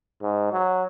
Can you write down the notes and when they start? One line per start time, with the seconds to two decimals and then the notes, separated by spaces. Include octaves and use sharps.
0.22 G#2
0.52 F#3